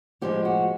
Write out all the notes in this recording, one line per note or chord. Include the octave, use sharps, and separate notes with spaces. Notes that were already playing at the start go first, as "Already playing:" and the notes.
A2 F3 G#3 G4
F#4